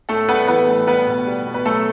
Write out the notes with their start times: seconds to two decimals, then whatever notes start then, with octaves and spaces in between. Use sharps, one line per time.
0.09 A2 A3 A4
0.28 G3 B3 B4
0.48 E3 B3 B4
0.68 A2
0.87 G3 B3 B4
1.07 B2
1.26 G3
1.47 B2
1.54 B4
1.66 F#3 A3 A4